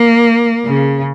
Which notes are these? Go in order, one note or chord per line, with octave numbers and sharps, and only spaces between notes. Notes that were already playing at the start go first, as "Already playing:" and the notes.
Already playing: A#3
C#3